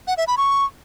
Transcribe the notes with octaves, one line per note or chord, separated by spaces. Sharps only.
F#5
E5
B5
C#6